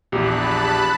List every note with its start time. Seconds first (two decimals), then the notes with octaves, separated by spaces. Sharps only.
0.12 A#1 E2 G4 A5 B5 F#6